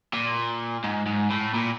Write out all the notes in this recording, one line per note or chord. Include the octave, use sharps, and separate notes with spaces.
A#2
G#2
G#2
A2
A#2